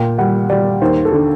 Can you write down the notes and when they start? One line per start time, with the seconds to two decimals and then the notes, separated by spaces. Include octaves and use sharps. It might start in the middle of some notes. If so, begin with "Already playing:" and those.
Already playing: A#2 G5
0.18 G3 F#5
0.50 G3 D5
0.82 D#2 C5
1.05 A4
1.12 D3